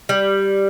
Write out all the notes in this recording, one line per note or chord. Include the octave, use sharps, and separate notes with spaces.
G3